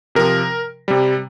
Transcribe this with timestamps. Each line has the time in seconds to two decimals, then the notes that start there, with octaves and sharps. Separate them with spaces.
0.15 C3 F3 A#4
0.88 C3 G3